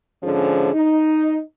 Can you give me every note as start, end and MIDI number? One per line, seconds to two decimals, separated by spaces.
0.23 0.73 44
0.23 0.73 50
0.23 0.73 53
0.23 0.73 61
0.23 0.73 68
0.73 1.40 63